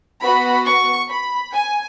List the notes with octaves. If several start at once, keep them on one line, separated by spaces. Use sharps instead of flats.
B3 F#4 B5
C#6
B5
G#5